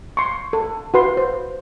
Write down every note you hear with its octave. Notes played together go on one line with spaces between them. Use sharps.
C6 C#6
A4
F#4 B4 C6
C5